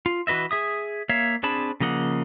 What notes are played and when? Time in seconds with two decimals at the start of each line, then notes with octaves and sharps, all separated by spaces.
0.06 F4
0.27 E3 F#4 B4 D#5 E5
0.51 G#4 E5 D#6
1.09 A#3 C#5 E5 F5
1.43 C4 D4 G#4 A5 B5
1.80 C#3 F3 A#3 D#5 F#5